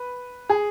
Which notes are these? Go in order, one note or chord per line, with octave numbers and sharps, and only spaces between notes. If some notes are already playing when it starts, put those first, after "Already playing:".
Already playing: B4
G#4